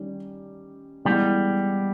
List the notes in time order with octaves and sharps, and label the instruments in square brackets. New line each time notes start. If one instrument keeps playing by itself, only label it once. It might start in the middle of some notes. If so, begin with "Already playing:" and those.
Already playing: [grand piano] D#3 G3 C#4 G4
[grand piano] E3 G#3 B3 [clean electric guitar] G3